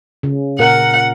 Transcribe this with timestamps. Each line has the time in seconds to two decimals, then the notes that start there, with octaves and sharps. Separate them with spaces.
0.23 C#3
0.59 A#2 A#4 F#5